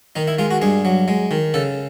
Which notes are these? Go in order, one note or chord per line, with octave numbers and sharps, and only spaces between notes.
D#3 D#4
E4
G#3 F4
F#4
G2 G#4
F#3
G#3
D#3
C#3 A4